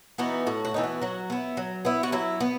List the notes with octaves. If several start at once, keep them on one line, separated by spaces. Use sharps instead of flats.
E3 B3 D#4 F#4
A2 F#4
F#4
E3 B3 D#4
F#4
F#3 F#4
B3 E4
F#3
B3 E4
F#4
F#3 E4
B3